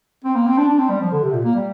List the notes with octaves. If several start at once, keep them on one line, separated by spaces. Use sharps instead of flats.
C4
A#3
C4
D4
D4
C4
G3
F3
D3
C3
A#2
A#3
G3